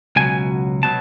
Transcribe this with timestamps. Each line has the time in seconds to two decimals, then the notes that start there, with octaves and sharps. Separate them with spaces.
0.16 C#2 B2 F#3 G#5
0.83 B2 F#3 A5